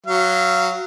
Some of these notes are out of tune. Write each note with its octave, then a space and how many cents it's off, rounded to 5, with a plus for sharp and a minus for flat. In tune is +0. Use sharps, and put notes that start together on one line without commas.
F#3 +0 F5 -25